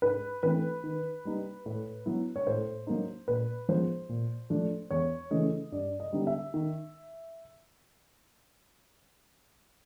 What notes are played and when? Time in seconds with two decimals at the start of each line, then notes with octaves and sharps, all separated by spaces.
0.02 G#2 B4
0.43 E3 A3 C4 B4
0.84 D#3
1.25 G3 A#3 D#4
1.66 A2
2.06 F#3 B3 E4
2.36 C#5
2.47 A2 C5
2.87 F#3 A#3 D#4
3.28 A#2 B4
3.69 F3 G#3 B3 C5
4.09 A#2
4.50 F3 A3 D4
4.91 E2 C#5
5.31 C#3 E3 A3 C#4 D#5
5.72 G2 D5
6.00 D#5
6.13 D3 G3 B3 D#4
6.27 E5
6.54 D#3